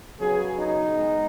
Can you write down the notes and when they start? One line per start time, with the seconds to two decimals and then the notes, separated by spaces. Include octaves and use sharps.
0.20 C#3 F#3 B3 G#4
0.57 D#4
0.94 G#3 B3